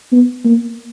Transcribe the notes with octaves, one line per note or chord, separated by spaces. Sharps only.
B3
A#3